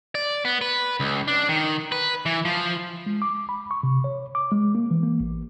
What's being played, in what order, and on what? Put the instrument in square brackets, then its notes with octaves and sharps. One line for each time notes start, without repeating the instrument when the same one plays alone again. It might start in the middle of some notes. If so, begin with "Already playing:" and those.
[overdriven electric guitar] D5
B3
B4
C#2
D4
D#3
B4
E3
F3
[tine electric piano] G#3
D6
B5
C#6
C3
C#5
D6
G#3
A#3
E3
A#3
A1